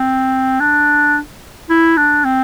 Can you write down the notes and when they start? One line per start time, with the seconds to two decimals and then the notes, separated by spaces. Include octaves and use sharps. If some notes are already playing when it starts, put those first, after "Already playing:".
Already playing: C4
0.60 D4
1.70 E4
1.97 D4
2.25 C4